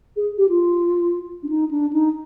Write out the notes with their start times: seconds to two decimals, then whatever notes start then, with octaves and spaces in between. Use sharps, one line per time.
0.16 G#4
0.38 G4
0.49 F4
1.43 D4
1.49 D#4
1.71 D4
1.93 D#4